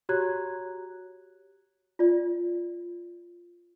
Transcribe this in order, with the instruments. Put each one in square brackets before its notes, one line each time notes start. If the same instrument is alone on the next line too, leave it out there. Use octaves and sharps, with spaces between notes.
[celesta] F#4 G4 C#5 A#5 F#6 G#6
[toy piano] F4 D5